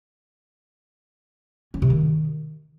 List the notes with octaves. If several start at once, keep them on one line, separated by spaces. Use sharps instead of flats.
C#4
C3
D#3